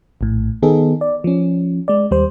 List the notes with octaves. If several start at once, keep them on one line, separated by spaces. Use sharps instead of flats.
A#1 A2
D#3 B3 D#4 G#4 A4
D5
F3 C#4
G#3 D5
D#2 G3 C5